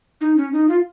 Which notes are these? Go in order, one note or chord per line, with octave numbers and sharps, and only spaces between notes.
D#4
C#4
D#4
F4